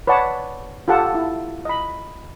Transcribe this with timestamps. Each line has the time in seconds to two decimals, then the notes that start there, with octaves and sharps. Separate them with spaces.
0.07 B4 C#5 D5 F#5 A5
0.88 F4 G4 A4 F#5 A5
1.15 E4
1.65 D#5 B5